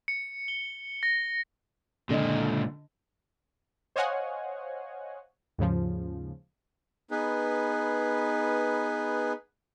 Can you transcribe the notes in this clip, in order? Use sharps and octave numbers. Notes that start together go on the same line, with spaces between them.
C#7
G7
A#6
C#2 A#2 D3 D#5
C5 C#5 D#5 F5 F#5 G#5
D#2 G#2 C#3 F3
B3 D#4 G#4 B4